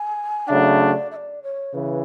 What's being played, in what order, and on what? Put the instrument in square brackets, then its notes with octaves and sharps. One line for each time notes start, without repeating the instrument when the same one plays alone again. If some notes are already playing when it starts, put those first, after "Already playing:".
Already playing: [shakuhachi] G#5
[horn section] C#3 F#3 A3 D4 [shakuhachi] E5
[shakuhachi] D5
E5
D5
C#5
[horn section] C#3 E3 [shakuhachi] B4